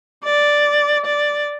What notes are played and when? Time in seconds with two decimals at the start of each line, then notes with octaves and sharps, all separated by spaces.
0.24 D5
1.06 D5